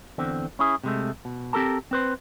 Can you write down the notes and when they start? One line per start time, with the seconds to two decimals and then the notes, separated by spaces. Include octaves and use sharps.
0.18 E2 D3 C4
0.59 C#4 E4 G#4
0.84 C3 G#3 A3
1.25 B2
1.53 C4 G4 A4 A#4 A5
1.91 C4 B4 C5